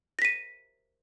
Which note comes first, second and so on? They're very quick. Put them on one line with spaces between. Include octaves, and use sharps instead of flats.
A#6 B6 D#7